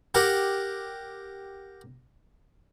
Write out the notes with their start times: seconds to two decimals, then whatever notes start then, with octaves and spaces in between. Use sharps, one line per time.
0.15 G4 A#4 F#5